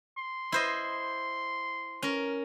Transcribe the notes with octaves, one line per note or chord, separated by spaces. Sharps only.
C6
E4 C5 D#5
C#4 A#4